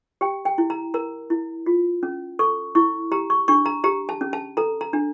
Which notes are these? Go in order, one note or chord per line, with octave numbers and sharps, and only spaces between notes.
G4 G5
G5
E4
A#5
A#4 A#5
E4
F4
C#4
A4 C#6
E4 C#6
G4 A#5
C#6
D4 C#6
A#5
G4 A#5
A5
C#4
A5
A4 A#5
A#5
D4